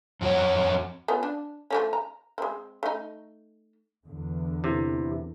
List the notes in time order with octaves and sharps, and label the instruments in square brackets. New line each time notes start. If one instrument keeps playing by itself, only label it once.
[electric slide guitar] F2 F#4 C#5
[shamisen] B3 C#4 F4
D4
F3 A3 C#4
A#5
G#3 C4
A3 D#4
[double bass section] E2 D3
[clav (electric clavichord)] C3 [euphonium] E4